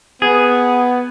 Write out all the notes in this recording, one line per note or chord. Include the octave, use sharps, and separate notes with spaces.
B3 G#4